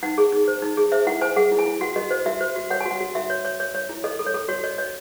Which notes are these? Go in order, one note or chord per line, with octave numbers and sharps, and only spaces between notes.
D#4 F#5
G#4
D#4
C5
D#4
G#4
C5 E5
E4 F#5
C5 G#5
G#4 F#5
E4
G#5
E4
F#4 F#5
F#4 D#5
C5 D#5
F#4 E5
C5
F#4
C#5 F#5
G#5
F#4
F#5
F#4
F#4 E5
C#5
C#5
C#5
C#5
E4
A4 D#5
A4
C#5
A4
F#4 C#5
C#5 D#5
C#5 D#5